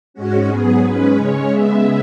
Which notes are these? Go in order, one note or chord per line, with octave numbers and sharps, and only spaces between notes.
G#2 G#3 C#4 F#4
G#2 F#3 B3 G#4
G#2 G#3 C#4 B4
C#3 G#3 C#4 C#5
C#3 G#3 B3 E5